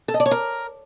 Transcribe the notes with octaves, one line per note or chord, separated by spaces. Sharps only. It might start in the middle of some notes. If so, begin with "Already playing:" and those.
A4
D#5
D5
C#5
A#4